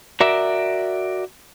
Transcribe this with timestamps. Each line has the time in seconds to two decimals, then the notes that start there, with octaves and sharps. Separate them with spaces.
0.20 F#4 A#4 D5 E5